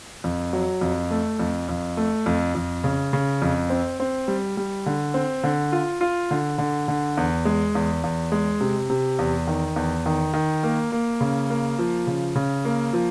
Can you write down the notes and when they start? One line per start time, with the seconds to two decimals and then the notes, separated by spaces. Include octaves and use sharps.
0.24 F2
0.53 F#3
0.81 F2
1.11 A3
1.39 F2
1.69 F2
1.97 A3
2.26 F2
2.55 F2
2.84 C#3
3.13 C#3
3.42 F2
3.70 C4
4.00 C4
4.28 G3
4.57 G3
4.86 D3
5.14 C4
5.44 D3
5.72 F4
6.01 F4
6.31 D3
6.58 D3
6.88 D3
7.17 E2
7.45 G#3
7.75 E2
8.04 E2
8.32 G#3
8.61 C3
8.90 C3
9.19 E2
9.47 D#3
9.76 E2
10.06 D#3
10.33 D#3
10.63 A#3
10.92 A#3
11.21 C#3
11.50 A#3
11.79 F3
12.07 C#3
12.35 C#3
12.65 A#3
12.93 F3